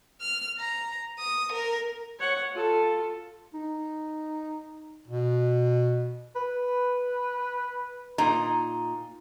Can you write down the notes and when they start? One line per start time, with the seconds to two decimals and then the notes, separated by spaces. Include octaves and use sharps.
0.21 F6
0.59 A#5
1.19 D#6
1.52 A#4
2.19 C#5 F#5
2.52 F4 A4
3.54 D#4
5.08 B2
6.36 B4
8.18 A#2 D#4 A#5